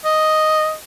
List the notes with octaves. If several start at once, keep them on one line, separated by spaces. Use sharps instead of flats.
D#5